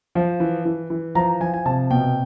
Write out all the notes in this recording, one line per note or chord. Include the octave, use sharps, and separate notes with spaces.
F3
E3
E3
E3
F3 A#5
F3 G#5
G#5
C3 A5
B2 G5